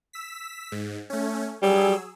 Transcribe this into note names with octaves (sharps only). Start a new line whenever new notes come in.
E6 B6
G#2
A3 C#4
F#3 G3 G#4 E6